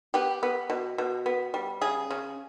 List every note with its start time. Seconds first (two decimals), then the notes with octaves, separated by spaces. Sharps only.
0.14 B3 G4
0.43 B3
0.70 B2
0.98 B2
1.26 B3
1.54 G3
1.81 C#3 G#4
2.11 C#3